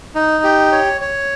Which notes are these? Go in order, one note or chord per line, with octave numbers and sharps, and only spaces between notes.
D#4
G4
C#5
C#5